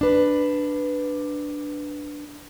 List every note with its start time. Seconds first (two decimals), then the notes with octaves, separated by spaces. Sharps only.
0.01 D4 B4